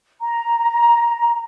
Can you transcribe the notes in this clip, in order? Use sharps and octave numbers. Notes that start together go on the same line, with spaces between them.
A#5